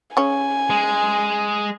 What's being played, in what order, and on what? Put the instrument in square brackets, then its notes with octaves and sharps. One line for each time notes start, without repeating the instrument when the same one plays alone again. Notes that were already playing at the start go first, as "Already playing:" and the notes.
[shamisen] C#3 C#4 [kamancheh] G#5
[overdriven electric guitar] G#3